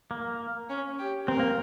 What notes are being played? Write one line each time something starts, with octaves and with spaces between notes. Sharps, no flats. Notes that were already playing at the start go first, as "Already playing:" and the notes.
A#3
C#4
G4
C4 A#4
A#3